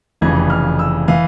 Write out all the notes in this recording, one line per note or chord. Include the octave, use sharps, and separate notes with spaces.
F1 F2 C#3 E3 G#6
F6
E6
E3 F5